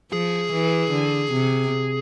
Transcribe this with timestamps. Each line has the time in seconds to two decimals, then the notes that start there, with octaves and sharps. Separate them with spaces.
0.12 F3 G#4
0.52 E3
0.92 D3
1.32 C3